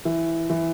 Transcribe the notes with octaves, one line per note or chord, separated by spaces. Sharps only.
E3
E3